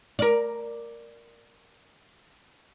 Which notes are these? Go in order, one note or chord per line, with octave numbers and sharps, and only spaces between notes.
A#4 D5